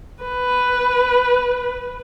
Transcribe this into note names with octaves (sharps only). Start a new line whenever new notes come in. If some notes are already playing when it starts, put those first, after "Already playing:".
B4